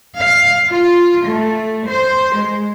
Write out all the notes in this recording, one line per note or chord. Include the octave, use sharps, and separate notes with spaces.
F5
F4
A3
C5
G#3